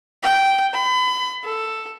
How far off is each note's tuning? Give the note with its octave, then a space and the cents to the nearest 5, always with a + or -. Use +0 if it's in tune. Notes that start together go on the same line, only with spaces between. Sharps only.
G5 -10
B5 +35
A4 +5